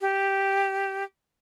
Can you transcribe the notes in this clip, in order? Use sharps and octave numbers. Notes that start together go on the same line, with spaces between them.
G4